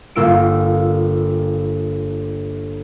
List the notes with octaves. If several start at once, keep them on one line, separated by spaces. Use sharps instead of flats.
G1 A#3 F4 E6 D7